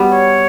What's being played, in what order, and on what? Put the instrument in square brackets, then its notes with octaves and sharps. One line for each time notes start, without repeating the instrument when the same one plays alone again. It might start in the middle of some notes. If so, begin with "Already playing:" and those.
Already playing: [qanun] G3 B3
[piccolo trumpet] C#5